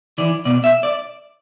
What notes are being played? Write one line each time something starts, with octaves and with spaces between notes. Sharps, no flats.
E3 D5
B2 D5
E5
D5